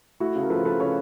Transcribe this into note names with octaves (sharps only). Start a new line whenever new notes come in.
A3 E4 F#4
C#3
A#4
F3 A4 B4
F3 A4 B4
C#3 B4 C#5